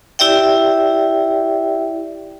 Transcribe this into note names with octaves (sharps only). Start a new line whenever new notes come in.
E4 G4 D5 E5 G5